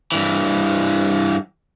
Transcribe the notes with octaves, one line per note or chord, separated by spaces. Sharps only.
G2 E3